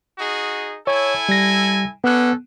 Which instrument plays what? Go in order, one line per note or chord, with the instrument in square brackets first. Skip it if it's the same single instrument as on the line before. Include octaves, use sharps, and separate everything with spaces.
[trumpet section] D#4 F#4 G#4
[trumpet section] E4 A4 G#5 [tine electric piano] C#5
[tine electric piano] G3 A#6
[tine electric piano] B3 F#6 [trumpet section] C#4 D4 A4